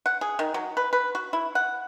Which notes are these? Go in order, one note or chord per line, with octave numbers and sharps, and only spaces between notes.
F#5
G#4
D#3
F#3
B4
B4
F#4
E4
F#5